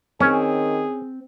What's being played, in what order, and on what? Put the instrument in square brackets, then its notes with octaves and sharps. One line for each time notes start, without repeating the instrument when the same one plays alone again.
[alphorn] D#3 [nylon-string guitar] C4 [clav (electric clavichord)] C#4 [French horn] G#4